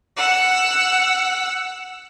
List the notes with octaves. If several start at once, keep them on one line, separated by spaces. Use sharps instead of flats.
F#5 E6